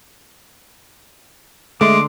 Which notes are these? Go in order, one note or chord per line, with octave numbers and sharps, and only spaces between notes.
D3 G#3 A3 C6 D6